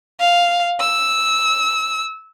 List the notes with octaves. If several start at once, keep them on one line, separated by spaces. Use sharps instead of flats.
F5
E6